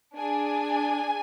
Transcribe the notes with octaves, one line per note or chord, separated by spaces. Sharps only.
D4 G#4 G#5